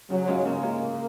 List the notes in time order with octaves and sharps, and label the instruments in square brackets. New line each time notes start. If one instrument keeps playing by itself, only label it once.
[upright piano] C#3 [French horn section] F#3
[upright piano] G#3 C#4 F4
[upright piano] C#3 [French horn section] A#3
[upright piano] G#3 C#4 F4
C#3